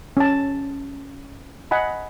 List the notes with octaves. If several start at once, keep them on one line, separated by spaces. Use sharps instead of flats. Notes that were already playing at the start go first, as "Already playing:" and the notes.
C#4 A5
D#5 F#5 G#5 B5